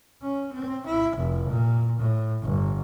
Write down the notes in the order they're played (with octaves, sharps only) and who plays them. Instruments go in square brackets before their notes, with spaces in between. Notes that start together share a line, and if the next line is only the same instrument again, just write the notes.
[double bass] C#4
C4
E4
F1
A#2
A2
G1